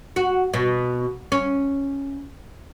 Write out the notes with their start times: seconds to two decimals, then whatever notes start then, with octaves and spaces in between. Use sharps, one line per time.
0.16 F#4
0.54 B2
1.32 C#4